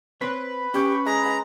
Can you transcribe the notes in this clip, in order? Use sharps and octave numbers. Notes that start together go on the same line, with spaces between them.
C4 B4 C#5
C#4 G4 C#6
G#3 A#5